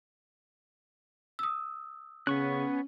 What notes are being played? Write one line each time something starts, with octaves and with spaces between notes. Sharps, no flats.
D#6 E6
C#3 B3 C#4 C#6 F#6